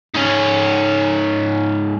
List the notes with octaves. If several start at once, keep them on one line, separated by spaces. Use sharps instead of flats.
G#2 C#4